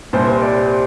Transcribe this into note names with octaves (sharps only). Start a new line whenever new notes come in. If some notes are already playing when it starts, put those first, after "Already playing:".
C2 A#2 G3 C5
C5
D5
C5